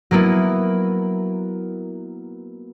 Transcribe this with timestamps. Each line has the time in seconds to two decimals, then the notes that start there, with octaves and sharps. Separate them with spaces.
0.11 F#3 A#3 B3 E4